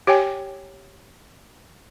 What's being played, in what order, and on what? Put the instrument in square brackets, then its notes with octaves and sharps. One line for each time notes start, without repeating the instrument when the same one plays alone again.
[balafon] G4 C#5 G5 G#5